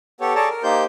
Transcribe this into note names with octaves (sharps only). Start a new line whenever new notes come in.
B3 G4 A4 C#5
G#4 A4 C#5 D5 A5 A#5
A#4
A#3 D#4 G4 C5 G6